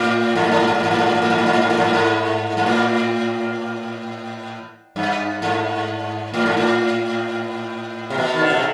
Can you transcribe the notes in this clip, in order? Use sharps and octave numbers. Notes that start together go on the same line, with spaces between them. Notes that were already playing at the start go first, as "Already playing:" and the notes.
Already playing: A2
G#2
A2
G#2
A2
G#2
A2
G#2
A2
G#2
A2
G#2
A2
G#2
A2
G#2
A2
G#2
A2
G#2
A2
G#2
G#2
A2
G2
G#2
A2
G#2
A2
C3
B2
D#3
D3
B2
C3